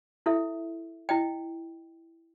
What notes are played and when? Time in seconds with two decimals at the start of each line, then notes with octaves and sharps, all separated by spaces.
0.26 E4 A4 E5
1.09 E4 D#5 G5